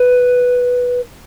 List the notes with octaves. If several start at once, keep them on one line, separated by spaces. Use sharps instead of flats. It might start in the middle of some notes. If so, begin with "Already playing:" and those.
Already playing: B4